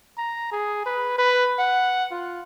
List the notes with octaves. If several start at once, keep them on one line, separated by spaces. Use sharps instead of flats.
A#5
G#4
B4
B4
F#5
F4